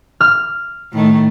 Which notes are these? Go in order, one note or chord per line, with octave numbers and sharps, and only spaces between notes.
F6
A2 D#3 A3